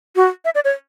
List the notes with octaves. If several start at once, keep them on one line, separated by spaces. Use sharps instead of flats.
F#4
E5
D5
C#5